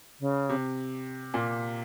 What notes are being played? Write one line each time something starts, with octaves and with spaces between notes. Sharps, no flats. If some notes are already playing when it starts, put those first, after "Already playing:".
C#3
C3
A#2